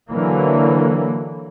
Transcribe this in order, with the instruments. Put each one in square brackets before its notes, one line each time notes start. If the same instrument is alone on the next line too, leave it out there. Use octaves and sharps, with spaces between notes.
[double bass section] D3 E3 F#3 A#3